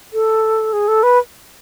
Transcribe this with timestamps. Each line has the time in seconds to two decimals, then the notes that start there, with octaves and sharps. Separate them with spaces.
0.13 A4
0.73 G#4
0.88 A4
1.03 B4